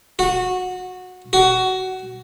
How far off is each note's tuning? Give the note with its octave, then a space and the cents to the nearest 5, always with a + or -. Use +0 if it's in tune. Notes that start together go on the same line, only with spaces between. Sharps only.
F#4 -15
F#4 +20